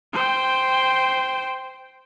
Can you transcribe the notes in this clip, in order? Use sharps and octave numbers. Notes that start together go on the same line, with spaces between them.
C5 G5